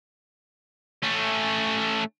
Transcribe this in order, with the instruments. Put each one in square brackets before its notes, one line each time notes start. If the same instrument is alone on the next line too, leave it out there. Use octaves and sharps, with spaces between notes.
[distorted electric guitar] A3 C#4